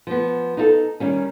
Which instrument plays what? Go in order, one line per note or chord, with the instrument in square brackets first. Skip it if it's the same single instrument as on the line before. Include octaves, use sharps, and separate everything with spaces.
[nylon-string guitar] F3 B3
D#4 E4 A4
D#3 G3 C#4